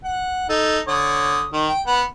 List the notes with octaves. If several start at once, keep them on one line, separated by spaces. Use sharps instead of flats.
F#5
D#4 A4
D3 C#5 D#6
D#3
G5
B3 F#5